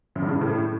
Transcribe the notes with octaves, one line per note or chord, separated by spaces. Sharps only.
F#2
G2
C#3
G2
A2